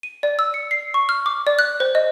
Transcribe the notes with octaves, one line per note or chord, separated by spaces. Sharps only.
D#7
D5
E6
C#7
C7
C#6
F6
D6
D5
F#6
C5
D#5